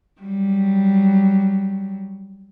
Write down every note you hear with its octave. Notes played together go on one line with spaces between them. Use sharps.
F#3 G3